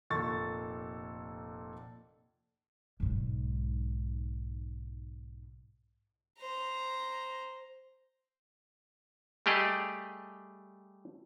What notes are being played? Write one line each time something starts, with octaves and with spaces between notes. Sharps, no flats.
F1 A#2 A4 C#6 A6
B1 G#2
C5 A#5
G3 A3 G4 G#4 D#5